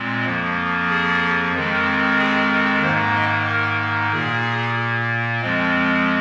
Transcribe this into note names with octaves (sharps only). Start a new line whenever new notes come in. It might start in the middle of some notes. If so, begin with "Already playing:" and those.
Already playing: A#2 G#3 C4
F2 F3 A#3
G#4
F2 D#3 G#3 C4
G#4
G#2 D#3 A#3 C5
D#5
A#4
A#2 A#3 G#4
F2 F3 G#3 C4